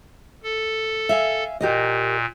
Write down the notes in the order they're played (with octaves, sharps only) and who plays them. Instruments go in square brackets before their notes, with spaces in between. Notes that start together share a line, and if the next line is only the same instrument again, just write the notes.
[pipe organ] A4
[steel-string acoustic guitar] E5 F5 G#5
[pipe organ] A#2 [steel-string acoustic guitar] G4 A#4 D#5